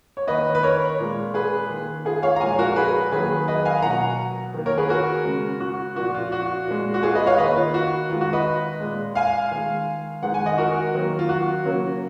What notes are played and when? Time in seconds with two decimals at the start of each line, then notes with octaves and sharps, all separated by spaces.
0.17 C#5
0.27 D#3 A#3 B4 D#5
0.55 B4
0.63 A#4 C#5
0.99 A#2 G#3
1.34 G#4 B4
1.70 D#3 A#3
2.05 F4 G#4
2.23 C#5 F5
2.36 A#5
2.40 A#2 F3 G#3 F5 G#5
2.59 F#4 A#4
2.76 G#4 B4
3.12 D#3 F#3 A#3 G#4 B4
3.48 B4 D#5
3.65 F5 G#5
3.82 B2 F#3 A#3 F#5 A#5
4.54 D#3 A#3
4.66 A#4 C#5
4.78 G#4 B4
4.89 F#4 A#4
5.25 C#3 G#3
5.60 F#4
5.96 A#2 F3 A#3 F#4
6.14 F4
6.32 F#4
6.67 A#2 G#3
6.94 F#4
7.03 F4 G#4
7.15 B4 D#5
7.26 C#5 F5
7.38 D#3 A#3 B4 D#5
7.56 F4
7.74 F#4
8.09 D#3 G#3 F4
8.21 F#4
8.33 B4 D#5
8.80 A#2 G#3
9.15 F5 G#5
9.51 D#3 G#3
10.23 D#3 G#3 F#5
10.34 G#5
10.46 D#5 F#5
10.58 F#4 A#4
10.94 D#3 F#3 A#3
11.19 F4
11.29 F#4
11.65 C#3 F#3 A#3